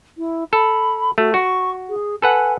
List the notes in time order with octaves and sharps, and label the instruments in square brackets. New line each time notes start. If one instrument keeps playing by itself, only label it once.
[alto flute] E4
[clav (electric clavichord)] A4 [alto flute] B5
[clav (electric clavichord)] A3 [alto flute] F#4
[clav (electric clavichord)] F#4 [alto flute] C#6
[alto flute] G#4
[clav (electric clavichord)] A4 B4 F#5 [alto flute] G#5